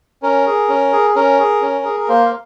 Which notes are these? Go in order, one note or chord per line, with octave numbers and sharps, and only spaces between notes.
C#4 A#4
G#4
C#4
G#4
C#4 A#4
G#4
C#4
G#4
A#4
A#3 C5
F5